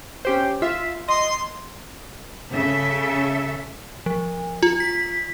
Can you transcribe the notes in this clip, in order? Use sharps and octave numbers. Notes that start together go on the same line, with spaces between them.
C#4 G4 C5
F4 E5
D#5 C6
C#3 A4 E5
F3
F4
B6